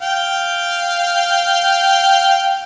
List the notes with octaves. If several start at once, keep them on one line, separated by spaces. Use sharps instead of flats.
F5 G5